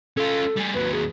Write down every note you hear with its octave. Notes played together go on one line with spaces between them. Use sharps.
C#4 F4 A4
G3 G#4
D#2 F#3 B4
G#4